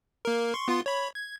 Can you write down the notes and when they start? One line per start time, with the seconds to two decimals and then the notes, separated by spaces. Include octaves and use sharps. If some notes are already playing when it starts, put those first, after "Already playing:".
0.25 A#3 A#4
0.54 C6 C#6
0.68 B3 F4 C6
0.86 C#5 B5
1.15 G#6